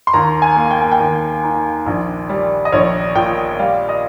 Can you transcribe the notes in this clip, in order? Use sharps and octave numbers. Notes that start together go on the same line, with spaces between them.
C6
D#2 A#5
G#5
A#3
G5
G#5
G5
D#2
D#4
A#1
G3
D#5
A#1 C#5
A#2 G5
G3 F5
D#5